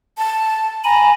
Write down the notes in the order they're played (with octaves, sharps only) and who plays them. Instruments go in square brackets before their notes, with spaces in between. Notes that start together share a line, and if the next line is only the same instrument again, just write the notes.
[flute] A5
[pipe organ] G#5 B5 [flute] A#5